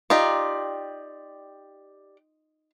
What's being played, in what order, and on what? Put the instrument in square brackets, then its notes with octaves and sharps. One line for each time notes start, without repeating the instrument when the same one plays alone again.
[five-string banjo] D#4 F4 [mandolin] G4 D5